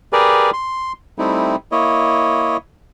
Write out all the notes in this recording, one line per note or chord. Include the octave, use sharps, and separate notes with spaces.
G4 G#4 A#4 B4 D5
C6
G3 A3 C4 D#4 E4
A#3 E4 C#5 D#5